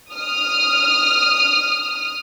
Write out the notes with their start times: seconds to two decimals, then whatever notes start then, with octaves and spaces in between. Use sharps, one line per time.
0.11 D#6 F6